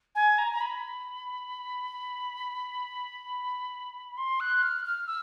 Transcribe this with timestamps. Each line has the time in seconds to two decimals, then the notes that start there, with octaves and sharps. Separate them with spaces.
0.15 G#5
0.38 A#5
0.52 A#5
0.61 B5
4.17 C6
4.40 F#6
4.62 F6
4.85 F6
5.07 E6